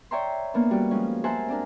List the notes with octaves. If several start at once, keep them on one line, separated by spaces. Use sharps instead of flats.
C#5 D5 E5 G5 A#5 C6
A#3 B3 D4
G3 C#4 F#4
F3 G#3 C#4
A#4 C5 E5 F#5 G#5 A5
C4 D4 A#4